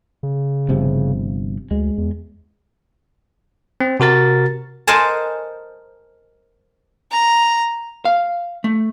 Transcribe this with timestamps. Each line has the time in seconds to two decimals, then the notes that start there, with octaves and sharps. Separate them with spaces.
0.23 C#3
0.69 G1 C3 F3
1.71 D2 G#3
1.98 E2
3.80 C4
4.00 C3 F#4 A#4 A6
4.87 A#4 C5 D#5 F#5 G#5 A5
7.12 A#5
8.05 F5
8.64 A3